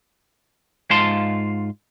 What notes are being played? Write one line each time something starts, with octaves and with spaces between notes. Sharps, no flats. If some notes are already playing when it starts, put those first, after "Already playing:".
G#2 F4 F5 A5 C6